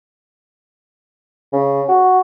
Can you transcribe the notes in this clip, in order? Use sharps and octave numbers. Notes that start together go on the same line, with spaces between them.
C#3
F#4